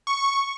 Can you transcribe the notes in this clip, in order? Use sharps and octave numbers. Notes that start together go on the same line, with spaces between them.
C#6